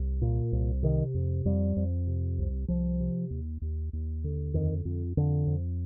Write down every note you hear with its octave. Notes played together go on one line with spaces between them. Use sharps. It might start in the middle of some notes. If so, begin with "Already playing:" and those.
Already playing: C2
A#2
C2
C3 D#3
F2
F2 G3
F2
C3
C2
C2 F3
C3
D#2
D#2
D#2
D3
F2 D#3
F2
F2 D3
F2